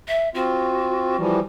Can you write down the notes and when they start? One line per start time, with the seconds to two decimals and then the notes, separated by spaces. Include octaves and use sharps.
0.08 E5
0.35 C4 F4 F#4
1.17 E3 F3 G3